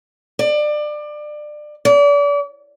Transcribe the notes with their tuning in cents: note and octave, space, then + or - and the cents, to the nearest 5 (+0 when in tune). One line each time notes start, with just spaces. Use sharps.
D5 +25
D5 -35